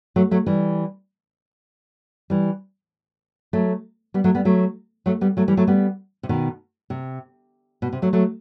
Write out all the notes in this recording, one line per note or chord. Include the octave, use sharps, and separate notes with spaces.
F#3 A3
F#3 A3
E3 G3
E3 G3
F#3 A3
G3 B3
F#3 A3
G3 B3
F#3 A3
F#3 A3
G3 B3
F#3 A3
E3 G3
F#3 A3
G3 B3
C3
B2 D#3
C3
B2
C3
F#3 A3
F#3 A3